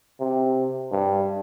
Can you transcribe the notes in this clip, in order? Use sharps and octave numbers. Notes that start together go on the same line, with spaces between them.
C3
G2